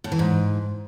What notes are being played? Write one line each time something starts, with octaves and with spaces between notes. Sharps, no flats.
A2
E3
G#2